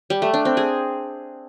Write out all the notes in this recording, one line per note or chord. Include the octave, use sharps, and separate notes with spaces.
G3
A3
D4
C4
G#4